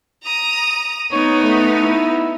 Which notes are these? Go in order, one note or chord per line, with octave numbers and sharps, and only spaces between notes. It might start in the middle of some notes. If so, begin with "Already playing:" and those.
A#5 D#6
B3 D#4 C#5
A3
E4